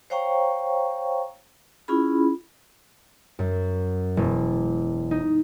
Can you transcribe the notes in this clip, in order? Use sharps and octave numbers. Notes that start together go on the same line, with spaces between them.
C5 C#5 F5 G5 A#5 C#6
C#4 E4 F4 G#4 B5
F#2
E1
D#4